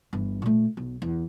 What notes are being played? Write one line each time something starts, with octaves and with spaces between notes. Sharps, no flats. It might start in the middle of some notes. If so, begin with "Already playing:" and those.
G1 E3
A#2 A3
B1
E2